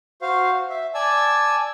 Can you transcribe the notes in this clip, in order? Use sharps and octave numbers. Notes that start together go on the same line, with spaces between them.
F#4 C5 F5
E5
D5 G#5 A5 E6